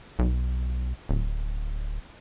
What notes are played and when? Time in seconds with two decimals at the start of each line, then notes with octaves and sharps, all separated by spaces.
0.19 B1
1.09 D1